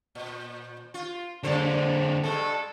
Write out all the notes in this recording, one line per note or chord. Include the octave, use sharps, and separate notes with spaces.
A#2
F4
F#2 D3 G#3 A4 C5
G2 G#3 A4